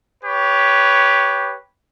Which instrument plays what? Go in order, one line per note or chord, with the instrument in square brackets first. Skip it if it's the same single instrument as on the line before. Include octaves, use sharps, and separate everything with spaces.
[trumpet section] G4 B4 C#5